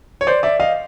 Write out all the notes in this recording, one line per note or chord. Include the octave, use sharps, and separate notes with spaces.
C#5
C5 D5
D5 E5
D#5 F5